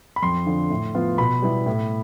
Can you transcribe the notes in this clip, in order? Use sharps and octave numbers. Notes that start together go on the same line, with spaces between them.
B5
F2 C6
D3 F3
A2
F3 B3 F4
B2 B5
G3 B3 E4
A2